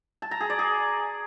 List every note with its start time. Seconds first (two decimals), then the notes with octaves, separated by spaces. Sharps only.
0.22 A5
0.31 A#5
0.40 G#4
0.50 D5
0.59 G#4